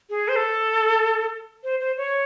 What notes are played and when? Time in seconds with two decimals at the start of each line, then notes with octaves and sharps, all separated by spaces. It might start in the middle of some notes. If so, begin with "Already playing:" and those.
0.10 G#4
0.28 C5
0.36 A4
1.64 C5
1.80 C5
1.97 C#5